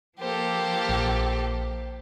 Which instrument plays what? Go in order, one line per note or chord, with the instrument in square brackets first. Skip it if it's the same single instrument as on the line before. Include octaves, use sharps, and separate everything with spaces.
[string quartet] F3 G4 A4 [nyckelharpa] A#3 C5
[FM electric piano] A#1